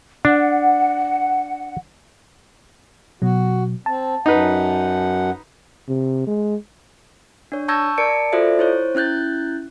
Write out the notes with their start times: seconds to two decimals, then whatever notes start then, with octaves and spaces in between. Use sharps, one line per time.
0.25 D4 F#5
3.22 B2 F#3 F#4
3.86 C4 A5
4.26 F#2 D#4 B4 F#5
5.88 C3
6.27 G#3
7.52 D4 C#5
7.68 A5 C#6 E6 G6 G#6 A#6
7.98 A#4 D5 A5 C#7 D7
8.32 F4 F#4 A4 C5 D5 E5
8.59 E4 C5 C#5
8.95 C#4 E4 F#6 G6 A6